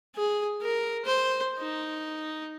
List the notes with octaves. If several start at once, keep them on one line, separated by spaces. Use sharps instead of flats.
G#4
A#4
C5
D#4